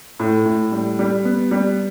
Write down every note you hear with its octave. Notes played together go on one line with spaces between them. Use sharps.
A2
A2
G3
G3
B3
G3